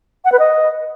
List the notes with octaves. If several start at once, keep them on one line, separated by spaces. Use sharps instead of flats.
F#5
B4
D#5